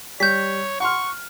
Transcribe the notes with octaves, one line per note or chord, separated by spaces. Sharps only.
G3 C#5 G6 B6
F#5 C6 C#6 F6